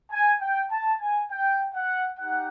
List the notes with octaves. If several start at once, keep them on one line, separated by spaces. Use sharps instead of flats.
G#5
G5
A5
G#5
G5
F#5
D#4 G4 F#5